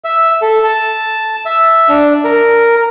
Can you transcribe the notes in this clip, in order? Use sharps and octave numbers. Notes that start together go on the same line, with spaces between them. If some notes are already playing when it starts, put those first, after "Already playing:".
E5
A4
A5
E5
D4
A#4